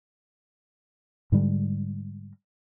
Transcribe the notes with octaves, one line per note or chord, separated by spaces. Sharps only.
G#2 D3 G3 G#3